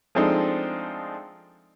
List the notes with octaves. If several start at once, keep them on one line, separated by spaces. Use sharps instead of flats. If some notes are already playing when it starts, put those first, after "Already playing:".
F3 G#3 A3 C4 D4 D#4